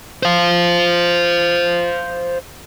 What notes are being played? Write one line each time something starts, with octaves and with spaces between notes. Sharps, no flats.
C5 F5